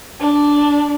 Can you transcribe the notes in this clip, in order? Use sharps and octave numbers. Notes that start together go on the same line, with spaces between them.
D4